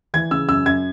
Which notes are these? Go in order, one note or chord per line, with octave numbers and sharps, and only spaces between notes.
E3 G#6
C#3 E6
F#2 E6
F#2 G#6